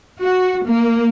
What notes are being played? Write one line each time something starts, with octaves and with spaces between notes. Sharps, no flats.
F#4
A#3